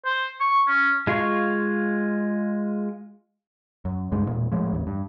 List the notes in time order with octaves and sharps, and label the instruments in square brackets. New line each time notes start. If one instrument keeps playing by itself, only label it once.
[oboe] C5
C#6
C#4
[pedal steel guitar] G#3 F4 F5 C#6
[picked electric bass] F#2
C#2 G2 G#3
E1 A#2
A2 F3 G#3
A1 D#2
G2